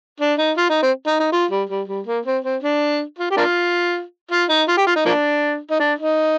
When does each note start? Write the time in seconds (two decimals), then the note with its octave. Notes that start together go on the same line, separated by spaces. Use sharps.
0.20 D4
0.38 D#4
0.57 F4
0.70 D#4
0.82 C4
1.07 D#4
1.19 D#4
1.32 F4
1.51 G3
1.69 G3
1.88 G3
2.06 A#3
2.25 C4
2.44 C4
2.63 D4
3.18 F4
3.31 G4
3.37 A#3 D4 F4
4.31 F4
4.49 D#4
4.68 F4
4.77 G4
4.87 F4
4.96 D#4
5.05 F3 A#3 D4
5.70 D#4
5.79 D4
5.98 D#4